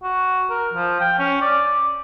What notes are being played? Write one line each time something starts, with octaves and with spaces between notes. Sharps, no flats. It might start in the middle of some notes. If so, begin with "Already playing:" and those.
F#4
A#4
F3
G5
C#4
D5